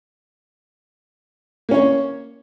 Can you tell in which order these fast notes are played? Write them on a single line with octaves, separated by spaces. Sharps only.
A#3 C#4 C#5